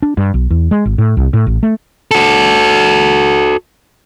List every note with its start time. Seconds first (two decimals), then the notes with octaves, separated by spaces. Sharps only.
0.02 D4
0.17 G2
0.34 B1
0.50 E2
0.71 G#3
0.85 G#1
0.98 A2
1.17 C2
1.33 A2
1.47 A1
1.63 A3
2.11 F#4 A4